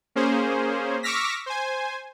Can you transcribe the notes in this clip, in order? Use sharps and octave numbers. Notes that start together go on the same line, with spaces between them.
A#3 C#4 G#4 C5
C#6 D6 E6 F6 A#6 B6
C5 G#5